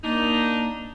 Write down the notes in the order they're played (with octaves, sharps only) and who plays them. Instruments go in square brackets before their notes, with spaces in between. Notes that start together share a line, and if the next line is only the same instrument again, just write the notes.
[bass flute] A#3 [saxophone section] D4 D#4